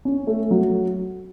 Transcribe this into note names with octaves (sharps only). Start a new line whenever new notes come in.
C#4
A3
F#3